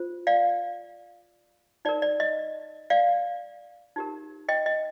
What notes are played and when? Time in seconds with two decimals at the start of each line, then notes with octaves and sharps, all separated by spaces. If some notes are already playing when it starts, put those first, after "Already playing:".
Already playing: F4 C5
0.27 D5 F5
1.85 D#4 D5
1.89 A#4
2.02 D5
2.20 D#5
2.90 D5 F5
3.96 D#4 G4 A#4
4.48 D#5 G5
4.66 D#5